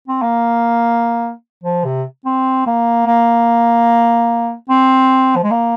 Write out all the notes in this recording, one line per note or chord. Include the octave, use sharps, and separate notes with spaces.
C4
A#3
F3
C3
C4
A#3
A#3
C4
F3
G#3
A#3